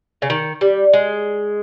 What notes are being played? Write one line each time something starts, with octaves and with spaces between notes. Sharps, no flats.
C#3
D#3
G3
G#3